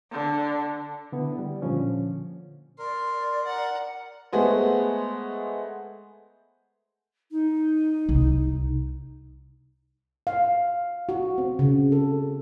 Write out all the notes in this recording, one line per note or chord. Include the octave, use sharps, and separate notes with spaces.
D3
D3 B3 E4
G3
A#2 D3 F3 C#4
A#4 D5 C6
F#5 A#5
G#3 A3 B3 G#4 C5
D#4
C2
F5
F#4
C4
C#3
A4